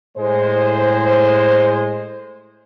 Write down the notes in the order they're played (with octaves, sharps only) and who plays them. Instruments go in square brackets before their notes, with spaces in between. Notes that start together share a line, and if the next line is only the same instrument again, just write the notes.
[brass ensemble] A2 G#3 C5